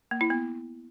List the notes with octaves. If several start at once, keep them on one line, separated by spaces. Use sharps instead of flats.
A#3
E4
B3